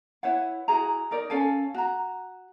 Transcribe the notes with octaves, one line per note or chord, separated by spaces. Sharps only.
E4 B4 C#5 F#5
E4 F#4 G#4 A#5
D#4 A#4 D5
C#4 A4 F5 G#5
F#4 A#5